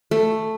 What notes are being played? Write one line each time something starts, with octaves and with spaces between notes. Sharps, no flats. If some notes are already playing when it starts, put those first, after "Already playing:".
A3